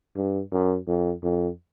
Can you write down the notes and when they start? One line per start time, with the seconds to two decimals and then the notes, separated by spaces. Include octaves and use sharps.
0.16 G2
0.52 F#2
0.87 F2
1.23 F2